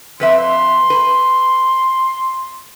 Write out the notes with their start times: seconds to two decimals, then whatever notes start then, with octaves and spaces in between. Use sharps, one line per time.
0.20 F2 B4 E5 C6
0.90 B4